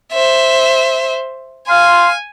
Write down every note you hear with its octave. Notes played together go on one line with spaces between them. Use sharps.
C5 E5
F5 G#5 C6